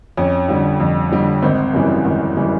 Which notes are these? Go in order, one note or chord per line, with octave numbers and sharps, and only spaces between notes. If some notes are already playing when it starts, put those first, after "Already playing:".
F2 C#4
D3 G3
F2
D3 G3
G#1 C4
F#2 C#3 E3 G3
G#1
C#3 E3 G3